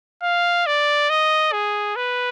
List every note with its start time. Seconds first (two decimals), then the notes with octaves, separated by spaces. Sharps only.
0.23 F5
0.66 D5
1.10 D#5
1.52 G#4
1.96 B4